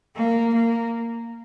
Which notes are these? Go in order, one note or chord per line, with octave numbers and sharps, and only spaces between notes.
A#3
A#3